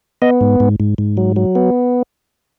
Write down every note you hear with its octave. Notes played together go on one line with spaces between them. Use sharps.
B3 D#5
G#2
G#2
G#2
G#2
F#3
F#3
B3